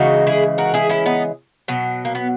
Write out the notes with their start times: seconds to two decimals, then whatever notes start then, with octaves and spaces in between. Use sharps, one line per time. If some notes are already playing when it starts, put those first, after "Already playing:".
Already playing: C#3 E3 G#3 D#4 F#4
0.27 E4 G#4
0.58 F#4 A#4
0.74 E4 G#4
0.89 C#4 E4
1.06 B3 D#4
1.68 B2 F#3
2.05 A#3
2.15 B3